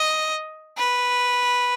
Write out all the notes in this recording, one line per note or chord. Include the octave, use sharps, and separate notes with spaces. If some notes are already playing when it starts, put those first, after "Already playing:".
Already playing: D#5
B4